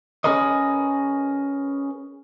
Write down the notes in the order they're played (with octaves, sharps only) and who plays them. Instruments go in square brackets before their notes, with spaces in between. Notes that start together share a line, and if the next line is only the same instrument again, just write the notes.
[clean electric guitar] C#4 G#4 A#4 B4 D#5